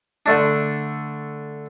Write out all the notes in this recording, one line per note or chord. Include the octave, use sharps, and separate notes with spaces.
D3 A3 D4